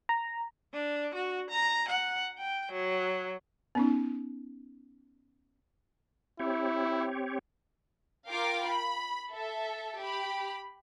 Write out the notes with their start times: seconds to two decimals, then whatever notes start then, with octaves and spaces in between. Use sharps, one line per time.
0.09 A#5
0.74 D4
1.15 F#4
1.50 A#5
1.89 F#5
2.38 G5
2.72 F#3
3.75 B3 C#4 D#4
6.39 C4 E4 G4 C#5
8.29 F4 A#4 F5 G5 D6
8.66 B5
9.32 A4 E5
10.01 G4 B5